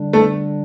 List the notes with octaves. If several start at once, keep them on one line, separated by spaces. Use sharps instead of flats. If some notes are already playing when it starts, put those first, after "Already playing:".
Already playing: D3 G3 D4
A3